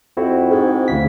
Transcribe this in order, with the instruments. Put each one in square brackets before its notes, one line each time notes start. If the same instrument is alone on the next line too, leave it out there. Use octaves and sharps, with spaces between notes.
[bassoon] F2 [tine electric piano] C4 E4 F#4
[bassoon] G#2
[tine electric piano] D2 C#3 B6